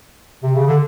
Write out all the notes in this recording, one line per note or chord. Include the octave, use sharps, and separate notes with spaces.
C3
C#3
D3